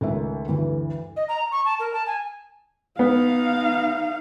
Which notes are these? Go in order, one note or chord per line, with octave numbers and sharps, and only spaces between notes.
C#2 D#3 A3 E5
D2 G2 E3
D#5
A#5
C#6
A5
A#4
A5
G#5
B3 D#4 F5